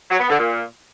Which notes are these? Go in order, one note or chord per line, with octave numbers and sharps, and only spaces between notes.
F#3
B3
D3
A#2